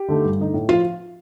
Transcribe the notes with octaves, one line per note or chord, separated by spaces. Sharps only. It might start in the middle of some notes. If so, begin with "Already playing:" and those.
Already playing: G4
D3 A3 D#4
G2
D3 A3 D#4
A2
F3 F4 F5